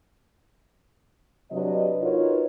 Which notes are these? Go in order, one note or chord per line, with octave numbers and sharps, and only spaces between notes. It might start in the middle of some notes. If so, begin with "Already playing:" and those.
C3 F#3 D4 B4 D#5
D#4 F4 F#4 A#4 B4 C#5